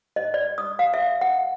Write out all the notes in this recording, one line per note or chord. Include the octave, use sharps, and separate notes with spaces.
D#5
D5
D#6
F5
E5
F#5